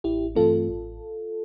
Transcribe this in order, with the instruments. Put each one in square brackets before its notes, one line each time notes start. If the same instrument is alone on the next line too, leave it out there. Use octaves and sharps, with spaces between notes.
[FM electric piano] A1 E4 G4
G2 E3 A3 C4 F4 A4
A1